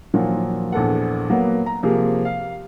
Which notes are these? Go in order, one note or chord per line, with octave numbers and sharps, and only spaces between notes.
A#2 D#3 F3 F#3
A#1 E2 A4 F#5
F#3 A#3 B3
A#5
C3 F3 A#3 G#4
F5